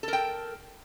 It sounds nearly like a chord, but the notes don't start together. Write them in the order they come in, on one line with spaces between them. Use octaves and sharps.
A4 A#4 G5